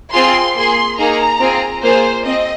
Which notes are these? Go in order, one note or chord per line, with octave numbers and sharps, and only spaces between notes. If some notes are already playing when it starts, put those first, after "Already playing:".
C4 F4 G#4 C6
A#3 G#4 C6
A#3 D#4 G#4 A#5
C4 F4 G#4
A#3 F4 G#4 C5
C4 D#5